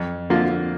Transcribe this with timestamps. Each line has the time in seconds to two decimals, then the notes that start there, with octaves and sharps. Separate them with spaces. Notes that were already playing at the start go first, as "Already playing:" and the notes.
Already playing: F2
0.30 D3 F3 A#3 F4